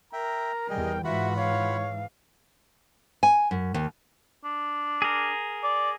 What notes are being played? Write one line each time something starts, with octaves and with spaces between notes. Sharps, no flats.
A#4 E5 G5 A#5
E2 G3 G#4 D#5 G5
G#2 E3 F4 F#4 E5 F#5 B5
C#5 F5
G#5
F#2
D#2
D4
G#4 A#4
D5